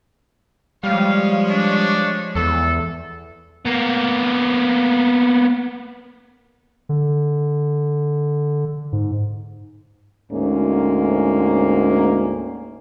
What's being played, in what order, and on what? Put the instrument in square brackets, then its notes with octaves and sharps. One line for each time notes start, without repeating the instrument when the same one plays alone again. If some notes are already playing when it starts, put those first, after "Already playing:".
[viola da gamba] F3 G#3 C#5 [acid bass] G3 [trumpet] F5
[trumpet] D4
[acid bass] E2 [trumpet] A4
[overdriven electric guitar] A#3 B3
[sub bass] D3
G#2
[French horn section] D2 G#2 A#3 C#4